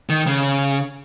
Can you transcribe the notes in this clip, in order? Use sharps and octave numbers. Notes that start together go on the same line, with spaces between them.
D#3
C#3